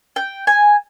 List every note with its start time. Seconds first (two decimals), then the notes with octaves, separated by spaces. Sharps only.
0.16 G5
0.47 G#5